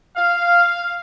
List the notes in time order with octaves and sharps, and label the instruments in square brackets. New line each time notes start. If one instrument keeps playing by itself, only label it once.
[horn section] F5